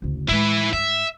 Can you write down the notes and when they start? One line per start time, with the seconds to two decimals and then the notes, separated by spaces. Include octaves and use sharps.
0.02 F#1 D2
0.29 A2 G#3 E4 B4
0.73 G2 E5